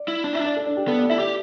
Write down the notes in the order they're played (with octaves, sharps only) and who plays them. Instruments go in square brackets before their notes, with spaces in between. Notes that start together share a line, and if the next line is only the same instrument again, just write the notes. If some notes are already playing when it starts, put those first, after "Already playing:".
Already playing: [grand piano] D5
[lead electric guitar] E4
[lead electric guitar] D4 [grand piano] D5
[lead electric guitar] E4 [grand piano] E5
[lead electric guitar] D4
[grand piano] D5
A4
D4
G4
[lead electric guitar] B3 [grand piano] A4
[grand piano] D5
[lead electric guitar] E4 [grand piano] E5
[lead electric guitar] G4 [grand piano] D5